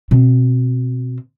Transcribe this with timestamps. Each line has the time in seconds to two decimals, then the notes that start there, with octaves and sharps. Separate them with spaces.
0.11 B2 C4